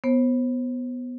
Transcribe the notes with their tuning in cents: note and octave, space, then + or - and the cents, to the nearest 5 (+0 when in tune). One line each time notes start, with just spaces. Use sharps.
B3 +5 C5 +35